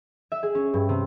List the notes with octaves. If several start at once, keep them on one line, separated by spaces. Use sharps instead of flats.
E5
G#4
C#4
G2
C3